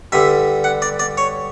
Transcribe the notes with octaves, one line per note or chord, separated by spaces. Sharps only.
G2 D3 G3 E5
F#5
D5
D5
C#5